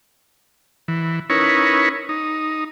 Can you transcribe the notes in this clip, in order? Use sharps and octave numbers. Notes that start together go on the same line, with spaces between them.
E3
C#4 D#4 E4 A#4 B4 C#5
D#4